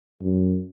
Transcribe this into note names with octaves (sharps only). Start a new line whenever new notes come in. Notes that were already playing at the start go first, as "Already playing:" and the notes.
F#2